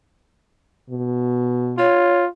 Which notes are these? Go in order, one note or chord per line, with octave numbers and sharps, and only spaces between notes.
B2
F4 C#5